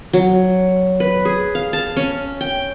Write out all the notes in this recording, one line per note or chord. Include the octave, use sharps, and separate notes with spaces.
F#3
B4
G#4
F5
A5
C#4
G5